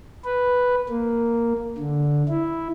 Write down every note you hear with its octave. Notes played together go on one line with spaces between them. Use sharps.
B4
A#3
D3
E4